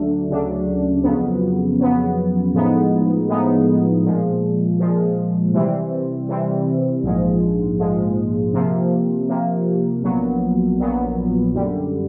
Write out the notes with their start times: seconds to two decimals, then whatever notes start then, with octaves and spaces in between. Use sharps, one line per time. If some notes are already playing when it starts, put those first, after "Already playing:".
Already playing: D2 F#3 A3 D4
0.28 D2 C#3 F#3 A3 D4
1.03 F2 C#3 F#3 B3
1.78 F2 C#3 F#3 B3
2.53 A2 F3 G#3 B3 D#4
3.28 A2 F3 G#3 B3 D#4
4.04 A#2 F3 G#3
4.79 A#2 F3 G#3
5.53 C3 E3 G3 C4
6.28 C3 E3 G3 C4
7.03 A#1 G#2 F3 G#3
7.78 A#1 G#2 F3 G#3
8.53 C3 F3 A#3
9.28 C3 F3 A#3
10.03 A#1 A#2 F#3 B3
10.78 A#1 A#2 F#3 B3
11.54 F#2 D3 G3